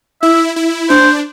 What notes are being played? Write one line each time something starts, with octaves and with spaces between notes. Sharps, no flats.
E4 E5
E4
D4 C5